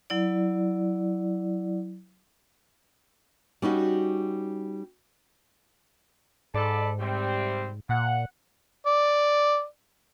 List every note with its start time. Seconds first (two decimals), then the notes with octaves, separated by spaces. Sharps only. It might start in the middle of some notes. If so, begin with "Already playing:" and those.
0.10 F#3 E4 D5
3.62 G3 C#4 D#4 F#4
6.54 G#2 A4 D5 B5
6.99 C3 G3 C4
7.89 A#2 F#5
8.86 D5